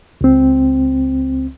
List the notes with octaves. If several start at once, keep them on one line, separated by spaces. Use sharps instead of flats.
C#2 C4